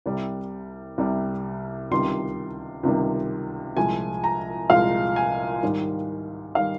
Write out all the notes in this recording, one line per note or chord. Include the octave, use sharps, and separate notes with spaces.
C2 C3 G3
C2 C3 G3
C#2 C3 D#3 G3 C6
C#2 C3 D#3 G3
C2 A#2 F3 G#3 G#5
A#5
C2 A#2 F3 G#3 F5
G#5
G#2 D#3 G3
D#3 G3 F5